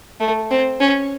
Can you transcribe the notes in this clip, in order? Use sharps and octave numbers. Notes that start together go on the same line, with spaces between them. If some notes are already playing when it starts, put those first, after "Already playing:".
A3
C4
C#4